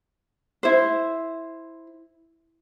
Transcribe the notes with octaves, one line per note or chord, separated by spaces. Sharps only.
E4 C5